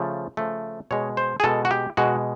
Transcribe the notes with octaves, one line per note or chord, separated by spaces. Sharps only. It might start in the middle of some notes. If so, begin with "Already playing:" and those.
Already playing: C#3 F3 A3
C#3 F3 A3
B2 G#3 C#5
C5
G#4
B2 G#3 A4
F#4
G4
B2 G#3 F#4